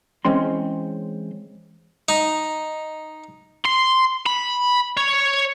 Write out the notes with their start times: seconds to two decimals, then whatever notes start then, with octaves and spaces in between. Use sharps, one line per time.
0.25 E3 G#3 C4 C#4 C6
2.09 D#4
3.66 C6
4.26 B5
4.97 C#5